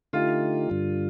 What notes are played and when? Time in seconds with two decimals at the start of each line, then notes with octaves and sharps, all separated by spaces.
0.13 D3 A3 D#4 F4 G4
0.70 G2 D3 G3